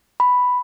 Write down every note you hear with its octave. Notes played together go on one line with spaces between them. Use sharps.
B5